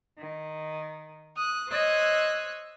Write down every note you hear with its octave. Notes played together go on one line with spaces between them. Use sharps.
D#3
D#6 F#6
C5 C#5 D#5 E6 F#6 G#6